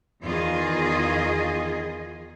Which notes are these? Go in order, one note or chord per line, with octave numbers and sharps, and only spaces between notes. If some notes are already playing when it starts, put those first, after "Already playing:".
E2 D#3 F4 G#4 D#5